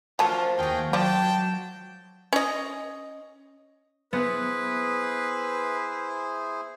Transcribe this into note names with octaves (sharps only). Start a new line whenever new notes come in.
F3 F#3 A3 A#3 C#4 D4 F4 A5
D#2 F4 F#4 G#4 G5
F3 F#3 D5 G5 A5
C#4 D#5
B3 E4 G#4 B4 C5